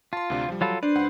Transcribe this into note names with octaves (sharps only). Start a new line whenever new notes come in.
F4 A5 C6
D2 C3 D4
F3 G3
F#3 F4 A4 B5
D4 B4 C5 D5
C#2 F#5